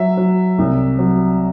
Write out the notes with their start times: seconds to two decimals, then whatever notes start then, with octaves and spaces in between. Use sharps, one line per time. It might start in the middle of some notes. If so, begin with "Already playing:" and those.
Already playing: F#3 E5
0.17 F#3
0.58 C2
0.99 F#3